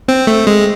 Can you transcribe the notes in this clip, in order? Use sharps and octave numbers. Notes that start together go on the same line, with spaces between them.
C4
A3
G#3